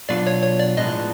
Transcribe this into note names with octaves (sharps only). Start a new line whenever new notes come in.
B2 F#3 B3 D4 F4 D5
C#5
C#5
D5
A2 F3 G#3 B3 D4 D#5